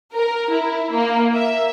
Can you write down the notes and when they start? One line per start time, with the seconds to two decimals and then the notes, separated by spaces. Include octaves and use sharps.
0.14 A#4
0.52 E4
0.92 A#3
1.34 E5